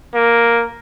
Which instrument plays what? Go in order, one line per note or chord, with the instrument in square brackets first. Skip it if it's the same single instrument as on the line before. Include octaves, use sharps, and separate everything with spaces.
[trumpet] A#3